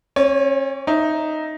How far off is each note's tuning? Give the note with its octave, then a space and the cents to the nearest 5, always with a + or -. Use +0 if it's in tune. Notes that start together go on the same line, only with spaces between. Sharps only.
C#4 -40 C#5 +20
D#4 +0 E5 +0